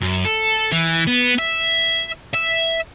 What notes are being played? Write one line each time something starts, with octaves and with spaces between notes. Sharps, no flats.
F#2
A4
E3
B3
E5
E5